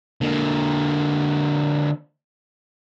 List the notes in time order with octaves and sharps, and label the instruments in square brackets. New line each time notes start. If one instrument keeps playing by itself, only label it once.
[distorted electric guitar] D3 A#3